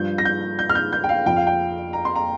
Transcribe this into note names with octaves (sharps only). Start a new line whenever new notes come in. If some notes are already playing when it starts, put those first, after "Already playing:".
Already playing: G2 F3 G6
A#6
G6
G6
F6
G6
G6
G5
F5
F2 F3 G5
F5
G5
A#5
C6
A#5